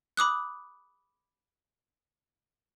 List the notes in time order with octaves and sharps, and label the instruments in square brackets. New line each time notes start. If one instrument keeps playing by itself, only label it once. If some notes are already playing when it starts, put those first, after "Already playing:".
[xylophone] B5 D6 D#6 F#6